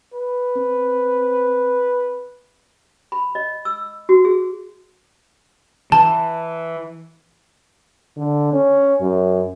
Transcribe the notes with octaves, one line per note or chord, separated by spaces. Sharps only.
B4
C4
B5
D#5
E6
F#4
G#4
E3 A5
D3
C#4
F#2